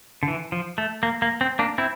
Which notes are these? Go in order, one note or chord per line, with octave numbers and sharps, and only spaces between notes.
D3
E3
F3
A3
A#3
A#3
C4
A#3 D4
C4 E4